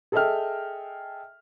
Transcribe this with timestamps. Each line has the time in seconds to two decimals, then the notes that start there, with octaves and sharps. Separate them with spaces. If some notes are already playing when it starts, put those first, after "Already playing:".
0.12 G#4 A4 D#5 E5 G5 F6